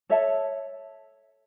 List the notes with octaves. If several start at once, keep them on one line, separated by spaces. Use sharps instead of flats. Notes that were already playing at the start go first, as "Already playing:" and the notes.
A4 C#5 E5 A5